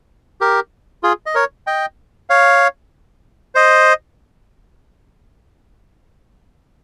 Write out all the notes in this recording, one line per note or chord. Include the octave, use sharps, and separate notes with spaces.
G4 A#4
F4 G#4
D#5
A#4 C#5
D#5 G5
C#5 F5
C5 D#5